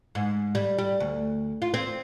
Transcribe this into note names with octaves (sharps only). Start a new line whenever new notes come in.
G#2
G3
G3
D2
F4
C4